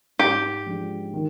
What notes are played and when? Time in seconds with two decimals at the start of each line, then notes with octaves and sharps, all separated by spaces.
0.19 G#2 G4
0.66 F3 G#3 D4
1.14 D#3